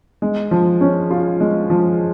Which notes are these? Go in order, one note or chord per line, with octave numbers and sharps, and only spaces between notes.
G#3
F3
C#4
F4
G#3
F3